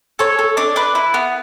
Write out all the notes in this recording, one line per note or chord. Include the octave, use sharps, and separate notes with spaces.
A4 C#5
A4
D4 D5
D4 B4
E4
B3